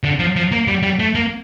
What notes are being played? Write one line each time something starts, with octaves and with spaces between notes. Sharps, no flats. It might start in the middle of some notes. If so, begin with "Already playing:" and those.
D3
F3
F3
A#3
G3
G3
A3
A#3